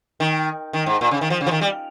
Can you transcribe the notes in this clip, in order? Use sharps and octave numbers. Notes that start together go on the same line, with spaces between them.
D#3
D#3
G#2
A#2
C#3
D#3
F3
C#3
F3
D#3
G3